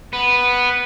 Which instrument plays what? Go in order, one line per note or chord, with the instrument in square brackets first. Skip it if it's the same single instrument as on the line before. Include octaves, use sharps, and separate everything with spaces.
[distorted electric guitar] B3